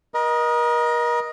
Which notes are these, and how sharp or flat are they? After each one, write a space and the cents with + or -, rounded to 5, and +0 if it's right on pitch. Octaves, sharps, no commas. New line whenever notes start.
A#4 +40 D#5 +0